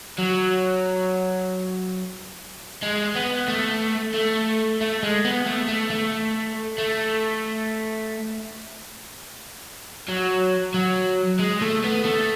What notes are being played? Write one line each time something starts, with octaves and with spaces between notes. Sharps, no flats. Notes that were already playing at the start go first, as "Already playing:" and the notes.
F#3
G#3
B3
A3
A3
A3
G#3
B3
A3
A3
A3
A3
F#3
F#3
G#3
A3
B3
A3